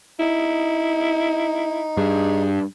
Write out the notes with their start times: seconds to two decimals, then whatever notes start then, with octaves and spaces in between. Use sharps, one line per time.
0.19 D#4 E4
1.97 G2 G#4